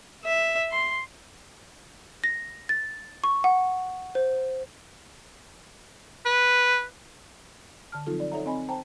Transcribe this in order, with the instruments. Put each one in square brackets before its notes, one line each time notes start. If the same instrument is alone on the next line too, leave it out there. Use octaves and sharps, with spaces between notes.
[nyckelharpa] E5
C6
[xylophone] A#6
A6
C#6
F#5
C5
[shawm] B4
[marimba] D3 A5 F6
F3 F#3 C4 D#4 F4 A4
D5
D#4 A4 C#5 E5 F#5 A#5
C4 D#5 G#5 B5
C5 G5 A5 A#5